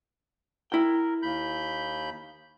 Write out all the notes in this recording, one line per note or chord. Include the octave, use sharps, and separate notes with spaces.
E4 A#4 G5
D#2 B5 G6